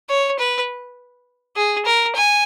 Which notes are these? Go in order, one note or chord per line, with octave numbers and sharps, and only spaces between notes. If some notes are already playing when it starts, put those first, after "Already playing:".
C#5
B4
G#4
A#4
G#5